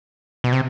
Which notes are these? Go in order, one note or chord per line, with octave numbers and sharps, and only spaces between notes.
B2
C3